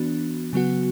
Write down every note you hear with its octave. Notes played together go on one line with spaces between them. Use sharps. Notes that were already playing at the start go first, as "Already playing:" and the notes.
Already playing: E3 B3 D4 F#4
C#3 F#3 B3 F#4